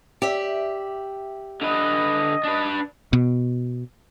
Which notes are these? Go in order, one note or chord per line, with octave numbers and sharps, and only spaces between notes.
G4 D5 E5
D3 B4 D#5
D4 B4
B2